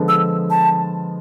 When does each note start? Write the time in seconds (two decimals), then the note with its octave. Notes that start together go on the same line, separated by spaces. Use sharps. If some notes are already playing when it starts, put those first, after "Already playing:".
Already playing: D3 F3 G#3 B3
0.08 E6
0.50 A5